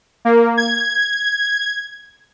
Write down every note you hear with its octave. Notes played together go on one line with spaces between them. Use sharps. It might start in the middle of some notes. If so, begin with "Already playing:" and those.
A#3
G#6